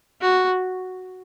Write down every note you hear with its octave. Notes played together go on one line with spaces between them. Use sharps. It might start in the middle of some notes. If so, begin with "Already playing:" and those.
F#4